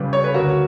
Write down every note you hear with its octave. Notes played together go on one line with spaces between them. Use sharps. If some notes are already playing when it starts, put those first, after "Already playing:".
Already playing: C#2 C#3 G3 B4
C#5
B4
D2 F#4 A#4